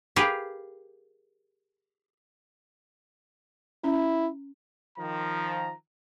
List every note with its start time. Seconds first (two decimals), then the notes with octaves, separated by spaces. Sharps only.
0.16 G4 G#4 A#4 B4 F5
3.84 C#4 E4
4.98 D#3 F3 A#5